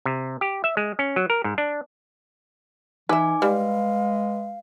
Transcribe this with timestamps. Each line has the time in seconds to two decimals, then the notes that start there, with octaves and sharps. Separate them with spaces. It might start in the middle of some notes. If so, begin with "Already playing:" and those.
0.05 C3
0.41 G4
0.64 E5
0.77 G#3
0.99 C#4
1.16 F#3
1.30 A#4
1.44 G#2
1.58 D4
3.09 E3 D#4 B4 E5 G#5 D6
3.42 G3 G#3 B4 F5